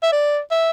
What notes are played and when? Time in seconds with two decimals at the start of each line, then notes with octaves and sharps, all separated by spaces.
0.03 E5
0.12 D5
0.51 E5